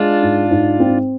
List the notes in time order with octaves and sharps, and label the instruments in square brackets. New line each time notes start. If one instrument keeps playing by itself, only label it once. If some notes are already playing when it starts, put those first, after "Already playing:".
Already playing: [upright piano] G#3 [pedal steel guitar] D4 F4
[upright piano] G#2
G#2
C4